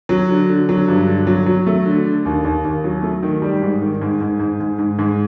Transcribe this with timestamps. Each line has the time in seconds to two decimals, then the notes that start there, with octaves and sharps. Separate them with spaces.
0.09 F#3
0.29 D3
0.49 D3
0.69 F#3
0.88 G2
1.07 D3
1.27 F#3
1.46 F#3
1.67 A3
1.85 D3
2.05 D3
2.25 D#2
2.44 D#2
2.65 D#2
2.84 F#3
3.03 A3
3.23 D#3
3.42 G3
3.62 G#2
3.81 D#3
4.01 G#2
4.20 G#2
4.39 G#2
4.60 G#2
4.79 G#2
4.99 G#2